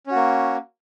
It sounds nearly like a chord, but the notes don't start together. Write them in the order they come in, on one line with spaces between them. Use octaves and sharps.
C#4 F#4 A#3